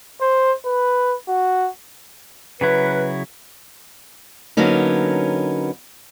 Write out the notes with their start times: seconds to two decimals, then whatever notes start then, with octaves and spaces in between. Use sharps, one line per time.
0.21 C5
0.66 B4
1.28 F#4
2.61 C#3 F#3 E4 B4
4.57 D3 F#3 A#3 B3 C#4 D#4